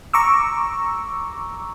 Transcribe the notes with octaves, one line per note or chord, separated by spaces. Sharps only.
A#5 C#6 D6 E6